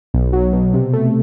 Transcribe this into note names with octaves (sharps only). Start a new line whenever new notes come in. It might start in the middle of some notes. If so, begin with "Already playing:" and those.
B1
F#3
B2
C3
A3